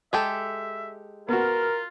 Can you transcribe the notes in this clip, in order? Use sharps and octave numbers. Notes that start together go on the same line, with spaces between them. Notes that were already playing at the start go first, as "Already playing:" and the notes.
G#3 G4 A4 E5
B3 F4 F#4 A#4